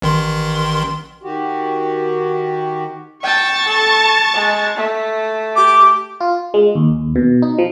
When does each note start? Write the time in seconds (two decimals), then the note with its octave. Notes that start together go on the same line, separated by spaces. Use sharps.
0.02 A1 D#3 C6
1.23 D#3 F#4 G4
3.23 G5 A5 C#6
3.66 A4
4.33 G#3
4.77 A3
5.56 G4 D6
6.20 F4
6.54 G#3
6.75 D#2
7.16 B2
7.42 D#4
7.58 F3